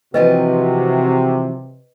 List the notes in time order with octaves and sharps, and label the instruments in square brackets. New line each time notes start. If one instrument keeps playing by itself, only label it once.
[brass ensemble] C3 [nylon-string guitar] E3 F3 C4 [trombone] F#4 [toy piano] B4 D#5